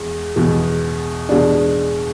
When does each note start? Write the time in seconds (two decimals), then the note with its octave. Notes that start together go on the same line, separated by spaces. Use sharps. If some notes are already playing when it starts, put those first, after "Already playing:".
Already playing: E2 G#3
0.36 E2 B2 G#3
1.29 E2 B2 G#3 D4